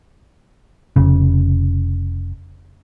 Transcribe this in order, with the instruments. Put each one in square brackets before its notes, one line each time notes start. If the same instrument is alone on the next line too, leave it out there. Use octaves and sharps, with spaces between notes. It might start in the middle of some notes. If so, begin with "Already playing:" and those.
[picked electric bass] F1 C#3